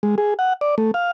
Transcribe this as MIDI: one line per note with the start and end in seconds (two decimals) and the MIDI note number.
0.03 0.15 56
0.18 0.34 68
0.39 0.53 78
0.61 0.75 74
0.78 0.91 57
0.94 1.11 77